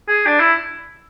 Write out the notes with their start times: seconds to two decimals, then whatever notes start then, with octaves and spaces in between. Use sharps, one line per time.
0.09 G#4
0.26 D4
0.40 E4